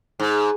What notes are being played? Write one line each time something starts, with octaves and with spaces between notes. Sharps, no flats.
G#2